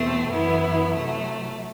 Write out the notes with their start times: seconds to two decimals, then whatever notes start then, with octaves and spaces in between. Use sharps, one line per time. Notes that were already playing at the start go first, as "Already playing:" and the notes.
Already playing: E2 B2 A3 C4
0.29 F#2 E3 B3 E4
0.93 C3 F#3 A3